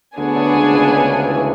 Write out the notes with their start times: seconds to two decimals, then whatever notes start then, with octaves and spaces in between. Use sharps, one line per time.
0.17 D2 D3 B3 D4 G#4 C#5 G#5
0.36 D2 D3
0.55 C#2 C#3
0.74 C#2 C#3
0.92 C#2 C#3
1.11 D2 D3
1.29 E3